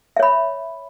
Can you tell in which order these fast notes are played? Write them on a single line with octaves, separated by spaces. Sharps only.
E5 C#5 B5